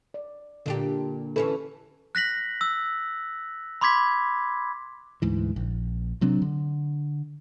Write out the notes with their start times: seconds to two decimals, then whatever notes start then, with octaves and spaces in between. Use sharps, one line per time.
0.14 D5
0.66 A#2 D3 D4 G4
1.36 E3 C#4 E4 A4 B4
2.15 F#6 A#6 B6 F#7
2.61 E6
3.81 B5 C6 D6 G#6 B6
5.22 D2 G#2 E3
5.56 A#1
6.21 C3 F#3 C4 D4
6.42 D3